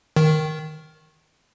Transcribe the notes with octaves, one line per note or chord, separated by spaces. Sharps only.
D#3